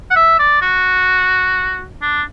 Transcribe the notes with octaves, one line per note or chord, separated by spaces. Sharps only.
F#5
E5
D5
F#4
D4